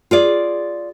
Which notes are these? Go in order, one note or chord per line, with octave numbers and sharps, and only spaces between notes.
F4 G#4 D5